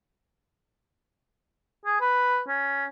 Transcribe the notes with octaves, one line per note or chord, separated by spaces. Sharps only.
G#4
B4
C#4